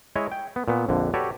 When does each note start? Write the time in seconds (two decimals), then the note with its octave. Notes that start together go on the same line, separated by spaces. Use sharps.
0.16 G#3 E4 C#5 D#5
0.32 G5
0.56 B3
0.68 A#2 B3
0.89 A#1 F2 D3
1.14 F#4 G4 A4 B4 C#5 D5